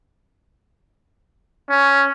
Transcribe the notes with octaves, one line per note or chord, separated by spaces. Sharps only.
C#4